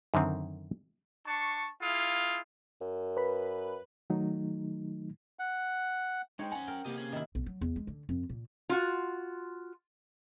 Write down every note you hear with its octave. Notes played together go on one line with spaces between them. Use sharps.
F#2 D3 D#3 C4
D4 A5 C#6
E4 F4 G#4 F5
F#2
B4 B5
D#3 F#3 A3 D#4
F#5
G#3 D#4 C5 C#5 G5
C#4 F#5 G#5 A#5
A#4 G5
C3 A#3 B3 G4 D#5
C#4 G#4
D#3 E4
B1
F#3
E2
G#3
D3
F2
A#2
F4 F#4